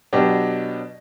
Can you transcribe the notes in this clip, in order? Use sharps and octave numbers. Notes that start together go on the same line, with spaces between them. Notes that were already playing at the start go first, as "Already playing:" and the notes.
B2 F#3 B3 D4 G4